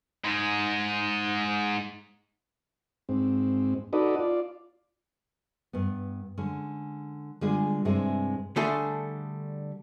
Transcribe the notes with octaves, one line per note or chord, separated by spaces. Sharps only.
G#2 G#3
G#2 C4
D#4 F#4 A4 B4 D5 D#5
F4 D5
G2 B3
D3 G#3 C#4
D3 G3 G#3 B3 F4 G#4
G2 C3 G#3 C4 E4 G#4
D3 G3 A3 D4 G#4 A4